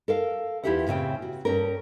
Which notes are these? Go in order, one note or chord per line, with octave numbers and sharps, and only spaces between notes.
A4 A#4 F5
E2 E4 F4 G4 E5 F#5
A2 C#3 C4 G5
F#4
G2 C#4 A4 A#4